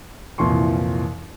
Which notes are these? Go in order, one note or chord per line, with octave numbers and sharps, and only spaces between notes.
C2 F2 A#2 E3 C6 C#6